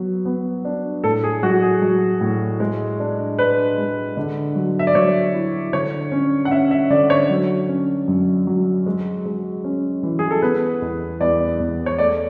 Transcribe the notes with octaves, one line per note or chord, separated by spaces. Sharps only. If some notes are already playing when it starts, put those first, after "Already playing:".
Already playing: F#3 B3
B3
D4
A2 A4
G#4
F#3 F#4
G#4
F#3
A2
G#3
D4
D4 B4
G#3
D3
F#3
E5
D5
F#3 C#5
E4
D3 C#5
C#4
F#5
C#4 E5
E5
D3 D5
C#5
F#3
C#4
F#2
F#3
G#3
G#3
C#4
E3
G#4
A4
B3 B4
E2
E2 D5
E2
C#5
A3 D5